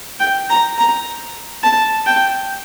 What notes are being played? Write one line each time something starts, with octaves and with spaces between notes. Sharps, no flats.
G5
A#5
A#5
A5
G5